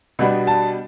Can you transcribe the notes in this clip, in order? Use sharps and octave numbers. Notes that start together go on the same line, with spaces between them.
B2 G3 B3 D4
A5